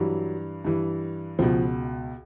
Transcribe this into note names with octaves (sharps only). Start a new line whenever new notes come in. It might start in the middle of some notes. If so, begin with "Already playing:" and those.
Already playing: G2 E3 F#3
G2 E3
C#2 B2 F3